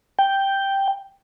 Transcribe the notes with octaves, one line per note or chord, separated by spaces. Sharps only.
G5